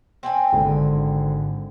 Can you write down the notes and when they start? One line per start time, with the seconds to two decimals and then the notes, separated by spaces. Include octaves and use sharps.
0.23 C4 G5 G#5
0.52 G#1 D3